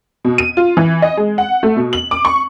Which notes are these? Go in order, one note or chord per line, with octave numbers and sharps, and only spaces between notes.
B2
D#7
F4
E3
D#5
G#3
F#5
A3
B2
F#7
D6
C#6